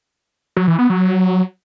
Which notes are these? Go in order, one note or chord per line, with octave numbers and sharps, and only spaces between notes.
F#3
E3
B3
F#3